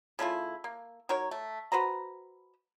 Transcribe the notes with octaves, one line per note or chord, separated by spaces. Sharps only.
C#3 A3 E4 F4
A#3
F#3 D#4 A#4 C#5
A3
F#4 B4 C5 A#5